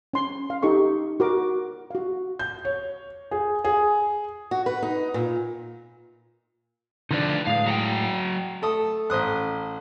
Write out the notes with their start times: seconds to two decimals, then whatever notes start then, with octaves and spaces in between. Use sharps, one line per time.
0.13 C#4 C6
0.50 F5
0.63 D#4 G4 A4 C#6
1.20 F#4 A#4 D6
1.91 F#4 F5
2.39 G6
2.65 C#5
3.31 G#4
3.64 G#4
4.51 F#4
4.66 B4
4.82 D#4
5.14 A#2
7.11 D3 F3 D4 D#4 B4 D5
7.47 A2 G#3 F5
7.66 F#3 F#5 G5
8.62 A3 A4 D#6
9.10 A1 C5 D#6 F#6